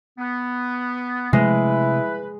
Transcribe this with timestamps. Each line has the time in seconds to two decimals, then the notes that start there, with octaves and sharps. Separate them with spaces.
0.19 B3
1.33 C3 G#3 A3 E4 B4